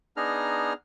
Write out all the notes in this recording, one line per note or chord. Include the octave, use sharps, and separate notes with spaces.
B3 D4 D#4 G#4 A#5 F6